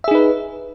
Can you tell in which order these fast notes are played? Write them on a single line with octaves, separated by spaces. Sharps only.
E5 G#4 D#4 B4